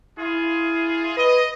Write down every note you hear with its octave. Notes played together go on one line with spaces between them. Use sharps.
E4 F4 G#4
B4 D#5